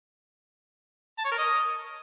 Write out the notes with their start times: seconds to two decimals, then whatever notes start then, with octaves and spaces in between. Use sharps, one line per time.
1.18 A5
1.25 C#5
1.32 A#4
1.38 D#5